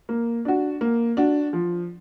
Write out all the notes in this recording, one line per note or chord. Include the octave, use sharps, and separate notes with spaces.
A#3
D4 F#4
A#3
D4 F#4
F3